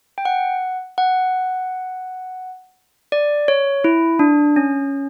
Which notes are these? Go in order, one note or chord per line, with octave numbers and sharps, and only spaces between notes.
G5
F#5
F#5
D5
C#5
E4
D4
C#4